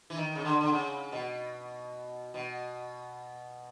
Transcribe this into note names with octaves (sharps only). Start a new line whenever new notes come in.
E3
D#3
C#3
D3
D3
C#3
B2
B2